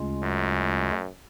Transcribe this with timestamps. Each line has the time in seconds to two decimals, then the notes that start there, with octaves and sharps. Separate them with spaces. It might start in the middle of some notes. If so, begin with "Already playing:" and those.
Already playing: D2 C#3 G#3 C#4 F4
0.23 F#2